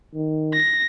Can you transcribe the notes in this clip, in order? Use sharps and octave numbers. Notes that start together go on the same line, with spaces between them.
D#3
A#6